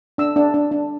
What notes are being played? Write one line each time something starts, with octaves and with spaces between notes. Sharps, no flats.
D4 E6
D4
D4
D4